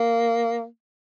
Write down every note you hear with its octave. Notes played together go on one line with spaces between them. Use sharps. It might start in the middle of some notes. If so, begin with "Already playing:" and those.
Already playing: A#3